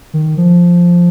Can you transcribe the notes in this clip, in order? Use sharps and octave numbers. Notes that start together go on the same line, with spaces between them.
D#3
F3